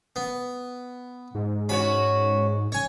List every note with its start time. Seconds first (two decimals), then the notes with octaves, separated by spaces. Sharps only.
0.16 B3
1.35 G#2
1.69 C#4 F#4 C#5 B5
2.72 C#5 G#5